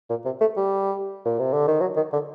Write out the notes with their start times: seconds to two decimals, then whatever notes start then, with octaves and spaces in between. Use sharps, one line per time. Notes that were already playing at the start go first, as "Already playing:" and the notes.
0.10 A#2
0.25 C3
0.41 A3
0.57 G3
1.26 A#2
1.39 C3
1.53 D3
1.68 D#3
1.81 F#3
1.97 D#3
2.13 D3